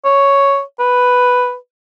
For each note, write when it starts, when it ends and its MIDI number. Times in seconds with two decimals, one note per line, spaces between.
0.05 0.62 73
0.79 1.56 71